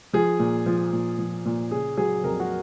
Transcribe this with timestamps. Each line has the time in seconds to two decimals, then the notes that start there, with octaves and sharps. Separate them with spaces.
0.13 F3 G#4
0.39 A#2
0.66 F3
0.93 A#2
1.19 F3
1.45 A#2
1.71 C#3 G#4
1.98 F#3 G#4
2.24 F2 A#4
2.40 F#4